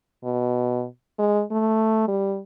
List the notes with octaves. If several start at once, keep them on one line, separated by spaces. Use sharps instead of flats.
B2
G#3
A3
G3